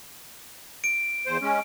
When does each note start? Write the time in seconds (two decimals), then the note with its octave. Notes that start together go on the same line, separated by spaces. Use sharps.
0.84 D7
1.26 E2 C5
1.42 G#3 C#4